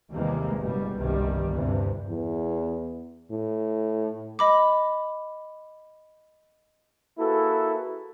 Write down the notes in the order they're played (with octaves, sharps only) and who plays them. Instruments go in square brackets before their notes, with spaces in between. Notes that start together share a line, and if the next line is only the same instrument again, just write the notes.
[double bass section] D#2 C3 E3 G3 G#3 A#3
F#1 B2 G3
G1 C2 G2 B2 D#3 G3
D2 G2 C3 E3
[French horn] E2
A2
[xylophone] D#5 B5 D6
[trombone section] A#3 E4 F#4 G#4 A4 B4